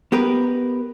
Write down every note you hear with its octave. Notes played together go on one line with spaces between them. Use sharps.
B3 G4 A#4 B4